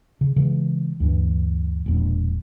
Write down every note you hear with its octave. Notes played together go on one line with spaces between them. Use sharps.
C#3
C#3 E3 G#3
D2 G2 E3
E1 A#1